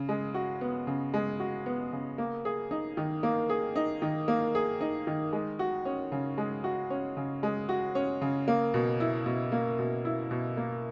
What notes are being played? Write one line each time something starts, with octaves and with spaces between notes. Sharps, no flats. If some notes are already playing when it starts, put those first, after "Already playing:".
Already playing: C#3
G#3
F#4
B3
C#3
G#3
F#4
B3
C#3
A#3
G#4
D#4
D#3
A#3
G#4
D#4
D#3
A#3
G#4
D#4
D#3
G#3
F#4
C#4
C#3
G#3
F#4
C#4
C#3
G#3
F#4
C#4
C#3
A#3
B2
E4
B2
A#3
B2
E4
B2
A#3